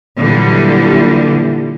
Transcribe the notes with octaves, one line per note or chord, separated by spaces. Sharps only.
A#2 D3 E3 F#3 G3